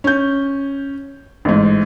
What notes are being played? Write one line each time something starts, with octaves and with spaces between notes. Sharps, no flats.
C#4 G6
A1 G#2